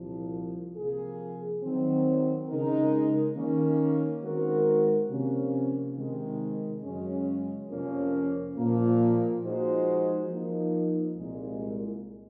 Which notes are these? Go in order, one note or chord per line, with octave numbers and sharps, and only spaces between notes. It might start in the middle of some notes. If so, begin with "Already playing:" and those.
Already playing: C2 A#2 F3
C3 F3 A#3 F4 G#4
D#3 F#3 C4
C#3 G#3 D#4 A#4
D#3 A#3 C#4
D#3 G#3 C4 F#4 A#4
C3 F3 A#3 C#4
C3 D#3 G#3
F#2 C#3 G#3 C#4
F2 C3 F3 A#3 C#4
A#2 F3 A#3
F3 G#3 D#4 F#4 C5
F3 A#3 D#4
C2 A#2 G#3